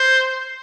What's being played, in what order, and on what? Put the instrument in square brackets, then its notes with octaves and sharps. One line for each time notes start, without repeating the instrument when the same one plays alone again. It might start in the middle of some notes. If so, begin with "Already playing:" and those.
Already playing: [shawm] C5